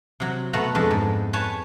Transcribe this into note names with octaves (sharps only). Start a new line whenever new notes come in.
C3 F#3
B2 A3 B3 F#5 A#5
F2 G#3 D4 A4 B4
G#2
B4 C#5 G#5 A5